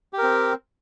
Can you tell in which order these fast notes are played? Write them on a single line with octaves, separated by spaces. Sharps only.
G4 A#4 C4